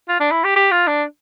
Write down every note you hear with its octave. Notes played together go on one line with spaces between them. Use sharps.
F4
D4
E4
G4
G4
F4
D4